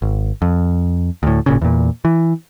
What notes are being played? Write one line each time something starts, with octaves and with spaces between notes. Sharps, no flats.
G#1
F2
D2 A2
G#1 A#2 C#3
E2 A#2
E3